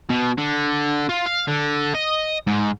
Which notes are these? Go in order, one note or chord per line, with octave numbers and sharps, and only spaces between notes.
B2
D3
F4
F5
D3
D#5
G#2